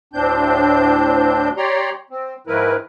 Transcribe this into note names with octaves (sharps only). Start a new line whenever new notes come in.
D2 A2 C4 D4 G6
G4 C#5 D5 A#5 C6
C4
G#2 D#3 F3 E4 A#4 B4